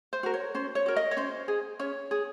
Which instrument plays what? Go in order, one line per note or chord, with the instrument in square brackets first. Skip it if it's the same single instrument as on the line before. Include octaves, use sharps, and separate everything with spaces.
[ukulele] C5
F#4 A#4
C#5
C#4 C5
C#5
F#4 A#4
D#5
C#5
C#4 C5
G#4
C#4 C#5
G#4